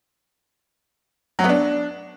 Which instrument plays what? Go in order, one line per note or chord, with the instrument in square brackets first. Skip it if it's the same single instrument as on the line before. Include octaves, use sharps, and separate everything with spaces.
[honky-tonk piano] F#3
B3
D4